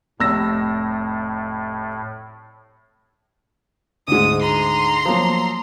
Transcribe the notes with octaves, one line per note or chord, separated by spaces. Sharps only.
F1 A2 E6 A#6
D2 G#2 D#6
A#5 C6
F3 F#3 A#3